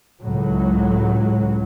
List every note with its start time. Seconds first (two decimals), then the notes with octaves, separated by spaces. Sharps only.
0.22 C#2 A2 F#3